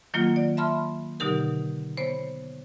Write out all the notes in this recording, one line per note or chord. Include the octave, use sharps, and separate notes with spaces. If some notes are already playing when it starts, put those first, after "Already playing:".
D#3 F#3 A#3 F4
D5
E5 A5 B5 C6 F6
B2 D3 F#3 D#4 G4 A#4
B3 C5 C#5